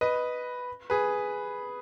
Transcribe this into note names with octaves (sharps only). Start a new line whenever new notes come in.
B4 D#5
G#4 B4